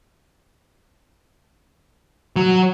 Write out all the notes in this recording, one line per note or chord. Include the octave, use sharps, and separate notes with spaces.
F#3